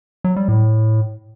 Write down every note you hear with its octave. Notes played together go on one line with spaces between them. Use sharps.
F#3
G3
A2